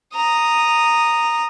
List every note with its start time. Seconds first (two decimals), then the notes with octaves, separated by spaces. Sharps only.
0.15 A#5 D#6